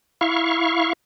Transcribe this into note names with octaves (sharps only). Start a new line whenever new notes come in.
E4 F5 C#6